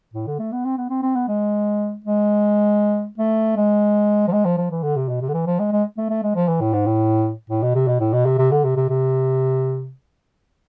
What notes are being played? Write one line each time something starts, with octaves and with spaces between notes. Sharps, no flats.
A2
D3
A3
B3
C4
B3
C4
C4
B3
G#3
G#3
A3
G#3
F3
G#3
F3
F3
E3
D3
C3
B2
C3
D3
E3
F3
G#3
G#3
A3
A3
G#3
F3
E3
A2
G#2
A2
A2
B2
C3
B2
A2
B2
C3
C3
D3
C3
C3
C3